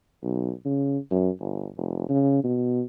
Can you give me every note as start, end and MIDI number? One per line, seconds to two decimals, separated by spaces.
0.23 0.51 35
0.65 0.98 49
1.11 1.30 42
1.41 1.68 31
1.77 2.05 29
2.09 2.43 49
2.44 2.83 47